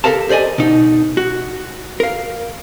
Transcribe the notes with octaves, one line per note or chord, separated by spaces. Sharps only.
G4 A4 A#4 F5 A5
G4 C5 D5 D#5 G#5
B2 D#4
F#4
A#4 F5